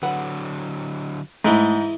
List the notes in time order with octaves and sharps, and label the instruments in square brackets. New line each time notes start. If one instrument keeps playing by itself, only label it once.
[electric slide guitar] D3 F#3 [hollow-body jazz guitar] B4 F#5
[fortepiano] G#2 [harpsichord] E3 G#3 E4 [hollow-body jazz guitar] A3